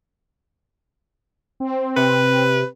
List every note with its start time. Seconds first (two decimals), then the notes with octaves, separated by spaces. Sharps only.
1.60 C4
1.96 C3 B4